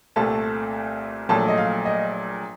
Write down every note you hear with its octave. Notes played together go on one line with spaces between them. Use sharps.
C2 A#2 A3 A5
A#1 A#2 F#3 A3 A5
D#5
F5
D#5